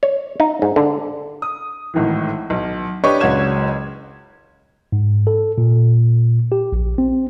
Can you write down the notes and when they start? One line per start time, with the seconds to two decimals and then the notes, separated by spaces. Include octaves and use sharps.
0.03 C#5
0.40 D#4
0.62 G#2
0.76 D3
1.42 D#6
1.94 G#1 A2 D#3 E3
2.50 B1
3.04 D4 G4 B4 C#5 D#5 C#6
3.20 F#1 C#2 F#4 C#5 G#6 E7
4.92 G#2
5.27 A4
5.58 A#2
6.52 G4
6.72 A#1
6.98 C4